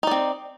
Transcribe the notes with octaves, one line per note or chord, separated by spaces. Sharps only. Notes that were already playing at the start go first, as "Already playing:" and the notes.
C4 D#4 D5